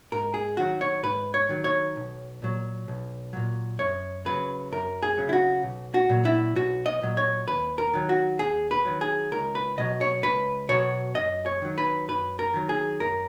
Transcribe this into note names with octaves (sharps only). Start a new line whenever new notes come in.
G#2 A#4
G#4
D#3 F#3 F#4
C#5
G#2 B4
C#5
D#3 F#3
C#5
B1
A#2 F#3
B1
A#2 F#3
F#2 C#5
C#3 F#3 B4
F#2 A#4
G#4
C#3 F#3
E4
F#4
B1
F#4
A#2 F#3
E4
B1 F#4
D#5
A#2 F#3
C#5
D#2 B4
A#4
D#3 F#3
F#4
D#2 G#4
B4
D#3 F#3
G#4
C#2 A#4
B4
B2 F#3 D#5
C#5
C#2 B4
B2 F#3 C#5
F#2 D#5
C#5
D#3 F#3
B4
F#2 B4
A#4
D#3 F#3
G#4
F#2 A#4